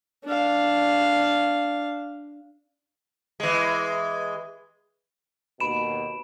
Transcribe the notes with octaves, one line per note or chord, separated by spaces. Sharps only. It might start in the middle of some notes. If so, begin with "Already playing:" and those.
D4 F5
E3 G#3
D#2 B2 B5 D7 E7